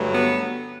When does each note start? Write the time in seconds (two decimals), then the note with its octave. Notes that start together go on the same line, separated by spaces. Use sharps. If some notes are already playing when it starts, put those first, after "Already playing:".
Already playing: G2 D3 F#3 A3
0.11 B3